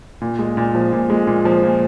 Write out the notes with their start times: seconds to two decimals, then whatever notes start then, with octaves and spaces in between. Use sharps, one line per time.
0.21 A#2
0.39 G#3
0.57 A#2
0.74 F3
0.93 A#2
1.10 G#3
1.27 A#2
1.45 F3
1.63 A#2